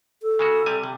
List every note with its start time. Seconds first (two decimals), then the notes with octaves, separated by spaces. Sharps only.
0.22 A4
0.39 C#3 G#3 F#4
0.66 C3 G3 G#5
0.84 C3